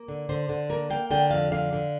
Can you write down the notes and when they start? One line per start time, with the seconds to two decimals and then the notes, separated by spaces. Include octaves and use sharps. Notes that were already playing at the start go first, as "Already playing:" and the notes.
Already playing: A#3
0.08 D3
0.29 D3 C5
0.49 D3
0.70 A#3 A#4
0.90 A#3 G5
1.11 D3 G5
1.31 F2 F5
1.52 D3 F5
1.73 D3